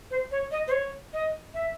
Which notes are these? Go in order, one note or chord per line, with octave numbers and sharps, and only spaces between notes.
C5
C#5
D#5
C5
C#5
D#5
E5